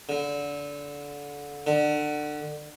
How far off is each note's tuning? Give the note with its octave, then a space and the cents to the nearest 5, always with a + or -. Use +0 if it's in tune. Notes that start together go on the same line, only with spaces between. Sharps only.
D3 -25
D3 +25